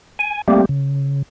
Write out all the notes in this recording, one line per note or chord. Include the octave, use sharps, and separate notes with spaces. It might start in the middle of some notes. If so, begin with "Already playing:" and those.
G#5
G3 A3 A#3 C4 G4
C#3